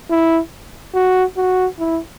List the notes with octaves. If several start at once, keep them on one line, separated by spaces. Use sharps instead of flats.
E4
F#4
F#4
E4